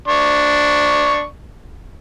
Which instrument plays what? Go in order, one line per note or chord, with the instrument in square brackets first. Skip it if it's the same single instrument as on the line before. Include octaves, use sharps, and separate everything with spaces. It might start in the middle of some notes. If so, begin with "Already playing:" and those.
[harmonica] D4 C#6